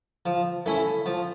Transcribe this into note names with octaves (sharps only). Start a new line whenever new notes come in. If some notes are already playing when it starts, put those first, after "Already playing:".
F3
A3 C#4 E4
F3